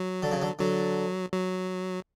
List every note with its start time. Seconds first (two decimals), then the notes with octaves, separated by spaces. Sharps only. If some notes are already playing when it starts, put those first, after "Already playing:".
Already playing: F#3
0.23 D3
0.32 C#3
0.42 D3
0.59 D3 F#3
1.33 F#3